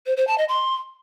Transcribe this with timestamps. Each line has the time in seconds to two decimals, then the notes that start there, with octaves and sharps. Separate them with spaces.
0.06 C5
0.17 C5
0.27 A5
0.38 D#5
0.49 C6